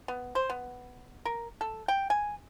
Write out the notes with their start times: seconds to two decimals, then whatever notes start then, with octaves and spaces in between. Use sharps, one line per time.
0.08 B3
0.35 C5
0.50 B3
1.25 A#4
1.61 A4
1.88 G5
2.10 G#5